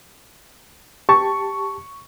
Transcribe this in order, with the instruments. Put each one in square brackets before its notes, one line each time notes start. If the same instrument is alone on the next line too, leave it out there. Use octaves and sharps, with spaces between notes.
[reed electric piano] G4 A5 [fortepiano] C#6